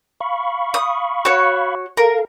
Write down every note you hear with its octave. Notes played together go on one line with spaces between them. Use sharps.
F5 B5 C#6
D#6
F#4 C#5
A4 A#4 F5